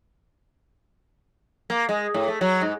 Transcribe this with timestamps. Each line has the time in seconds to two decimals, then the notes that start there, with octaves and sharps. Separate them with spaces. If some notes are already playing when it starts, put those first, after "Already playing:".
1.70 A#3
1.89 G#3
2.14 A2
2.28 A3
2.41 F#3
2.61 G#2